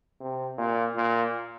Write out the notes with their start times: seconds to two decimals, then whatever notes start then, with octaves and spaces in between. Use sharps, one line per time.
0.20 C3
0.58 A#2
0.96 A#2